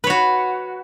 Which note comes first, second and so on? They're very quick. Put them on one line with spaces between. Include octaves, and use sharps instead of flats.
B4 C#5 F#4